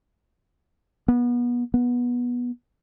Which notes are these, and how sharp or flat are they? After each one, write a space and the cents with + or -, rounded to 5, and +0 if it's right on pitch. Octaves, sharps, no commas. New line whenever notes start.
B3 -30
B3 -20